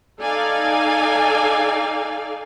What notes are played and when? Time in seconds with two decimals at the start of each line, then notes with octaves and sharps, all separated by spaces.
0.21 D#4 A4 D5 F5 G#5